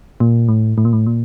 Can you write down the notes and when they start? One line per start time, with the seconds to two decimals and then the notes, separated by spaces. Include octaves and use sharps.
0.20 A#2
0.48 A2
0.78 A2
0.85 A#2
0.93 A2
1.06 A#2